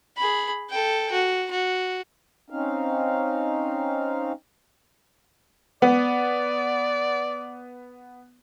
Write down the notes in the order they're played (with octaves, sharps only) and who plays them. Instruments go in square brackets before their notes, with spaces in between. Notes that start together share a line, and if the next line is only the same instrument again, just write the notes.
[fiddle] G#4 B5
A4 G5
F#4
F#4
[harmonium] C4 C#4 D#4 F5
[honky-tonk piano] B3 [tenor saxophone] D5